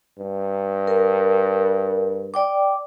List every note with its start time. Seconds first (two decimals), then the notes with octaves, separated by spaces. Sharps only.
0.18 G2
0.87 A#4
2.34 D5 G5 D6